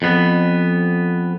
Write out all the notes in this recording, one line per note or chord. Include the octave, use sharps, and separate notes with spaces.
F2 B3